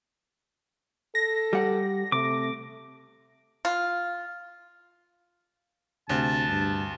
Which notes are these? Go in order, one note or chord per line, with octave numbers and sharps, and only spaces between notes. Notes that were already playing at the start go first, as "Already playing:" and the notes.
A4 A#6
G3 F#5
C3 A3 D6
F4
D2 C3 A5
G2